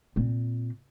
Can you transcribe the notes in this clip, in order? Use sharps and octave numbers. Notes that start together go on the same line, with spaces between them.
A#2 C4